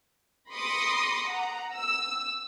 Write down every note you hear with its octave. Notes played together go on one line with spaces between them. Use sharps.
B5 C6 D6 D#6 A#6 C#7
F#5 A#5
E6